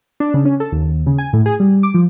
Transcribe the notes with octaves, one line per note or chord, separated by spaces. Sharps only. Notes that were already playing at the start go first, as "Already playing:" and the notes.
D4
C#3
C#4
A4
D#2
C#3
G#5
A2
G#4
G3
D6
F3